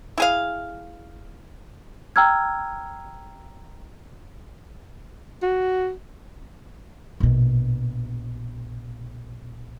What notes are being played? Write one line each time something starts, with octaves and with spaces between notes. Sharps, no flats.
E4 G#4 F5
G5 A#5 E6 F6 G#6
F#4
A#1 B2